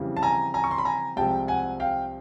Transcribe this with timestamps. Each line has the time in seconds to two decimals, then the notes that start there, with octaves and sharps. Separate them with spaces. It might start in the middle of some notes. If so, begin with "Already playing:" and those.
Already playing: F2 C#3 E3 G3
0.17 A5
0.23 G#5 A#5
0.54 G#5 A#5
0.64 C#6
0.71 C6
0.78 B5
0.85 G#5 A#5
1.17 C2 C3 F3 G#3 G5 A5
1.48 F#5 G#5
1.80 F5 G5